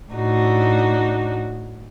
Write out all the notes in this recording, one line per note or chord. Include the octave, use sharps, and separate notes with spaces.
A2 D4 D#4 F#4